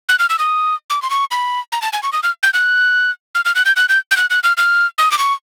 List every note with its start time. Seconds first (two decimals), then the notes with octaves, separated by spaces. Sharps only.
0.09 F#6
0.19 F6
0.30 E6
0.39 D#6
0.90 D6
1.02 C6
1.10 C#6
1.31 B5
1.72 A#5
1.82 A5
1.93 G#5
2.03 C#6
2.13 D#6
2.23 F6
2.43 G6
2.54 F#6
3.35 F6
3.45 F6
3.55 F#6
3.65 G6
3.76 F#6
3.89 G6
4.11 G6
4.17 F#6
4.30 F#6
4.43 F6
4.57 F6
4.98 D#6
5.11 D6
5.19 C#6